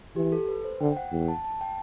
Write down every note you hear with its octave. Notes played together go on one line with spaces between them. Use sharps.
E3 G4
A4
B4
C5
D3 G5
G5
F#5
E2
A5
A5
G5